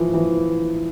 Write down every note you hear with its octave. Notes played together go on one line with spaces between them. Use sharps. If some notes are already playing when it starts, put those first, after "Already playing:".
Already playing: E3 F3
E3